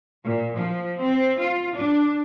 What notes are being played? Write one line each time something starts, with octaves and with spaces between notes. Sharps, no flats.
A#2
F3
C4
F4
D4